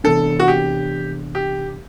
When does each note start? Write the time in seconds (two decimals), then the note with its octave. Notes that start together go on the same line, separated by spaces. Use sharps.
0.04 C3 E3 B3 D4 A4
0.39 F#4
0.48 G4
1.35 G4